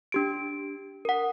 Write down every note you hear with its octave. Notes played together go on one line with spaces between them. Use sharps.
D4 G4 D7
A#4 F#5